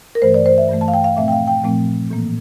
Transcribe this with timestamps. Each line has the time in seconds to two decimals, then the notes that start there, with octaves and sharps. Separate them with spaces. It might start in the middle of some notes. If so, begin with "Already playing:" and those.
0.15 A#4
0.22 G2 E3 A3 C5
0.34 D5
0.46 C5
0.58 E5
0.69 G2 E3 A3
0.81 A5
0.88 F5
0.94 G5
1.04 F5
1.17 A#2 F3 A3 C4 E5
1.28 G5
1.32 F5
1.48 G5
1.64 A#2 F3 A3 C4
2.10 A2 E3 A#3